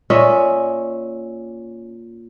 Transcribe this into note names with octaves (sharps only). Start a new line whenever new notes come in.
A#2 C#4 D#5 E5